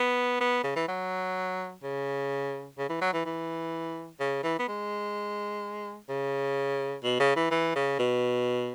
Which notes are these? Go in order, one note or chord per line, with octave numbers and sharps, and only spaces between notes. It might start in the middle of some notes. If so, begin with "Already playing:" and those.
Already playing: B3
B3
C#3
E3
F#3
C#3
C#3
E3
F#3
E3
E3
C#3
E3
B3
G#3
C#3
B2
C#3
E3
E3
C#3
B2